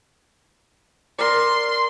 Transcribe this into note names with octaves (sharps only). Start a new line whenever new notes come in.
A#4 D5 C6